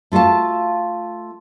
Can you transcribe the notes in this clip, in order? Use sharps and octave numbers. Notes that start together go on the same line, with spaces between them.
A3 F4 F#4 F5 A5